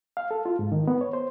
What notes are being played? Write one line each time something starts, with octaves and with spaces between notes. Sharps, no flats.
F5
A4
F4
G#2
D#3
B3
C#5
C5